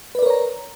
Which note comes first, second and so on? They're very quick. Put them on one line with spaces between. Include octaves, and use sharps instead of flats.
B4 D5 A#4 C#5 A#5